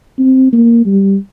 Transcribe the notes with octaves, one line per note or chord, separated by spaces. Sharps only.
C4
A#3
G3